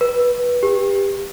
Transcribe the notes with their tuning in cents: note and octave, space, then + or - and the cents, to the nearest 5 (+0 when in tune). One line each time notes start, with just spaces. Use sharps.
B4 -15
G4 +20